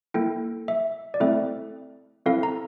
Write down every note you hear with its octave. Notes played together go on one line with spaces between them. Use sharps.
A#3 E4 A4 G5
E5
D5
A3 C4 E4 A4 E5
C4 E4 A4 F5
A#5